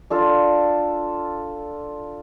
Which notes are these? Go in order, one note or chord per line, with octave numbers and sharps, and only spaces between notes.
D4 F4 A4